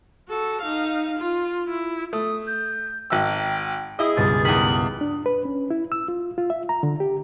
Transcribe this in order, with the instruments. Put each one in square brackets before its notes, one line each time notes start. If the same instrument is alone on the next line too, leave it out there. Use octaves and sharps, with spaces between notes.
[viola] F#4 A4
D#4 F5
F4
E4
[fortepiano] A3 [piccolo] D#6
[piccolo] G6
[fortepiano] G#1 E6 [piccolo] G5
[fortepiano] E4 D#5 [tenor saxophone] G#4 [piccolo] D#6
[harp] C#2 G2 B2 [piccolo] A6
[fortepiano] E2 D#3 [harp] D#6 B6 [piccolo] F#7
[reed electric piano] D4
B4
C#4
E4
E6
F4
F4
E5
A#5
D3
G4